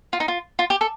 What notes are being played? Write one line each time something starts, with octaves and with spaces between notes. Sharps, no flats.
F4
D#4
F4
F4
G4
A4